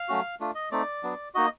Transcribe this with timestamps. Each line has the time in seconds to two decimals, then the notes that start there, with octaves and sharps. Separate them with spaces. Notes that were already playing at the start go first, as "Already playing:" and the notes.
Already playing: F5
0.08 F#3 A3 C#4 F#4
0.40 A3 D4 F4
0.55 D#5
0.71 A3 C4 D#4 D5
1.03 F#3 B3 D4
1.35 A#3 D#4 F#4 D#5